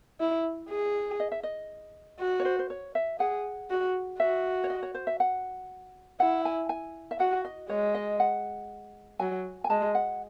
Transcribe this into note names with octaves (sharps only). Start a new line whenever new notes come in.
E4
G#4
D#5
E5
D#5
F#4
C#5
C5
C5
C#5
E5
G#4 F#5
F#4
F#4 E5
C#5
D#5
C#5
C5
E5
F#5
E4 F#5
G#5
G#5
E5
F#4 F#5
D#5
G#3 C#5
D#5
F#5
F#3 G#5
G#5
G#3 A5
F#5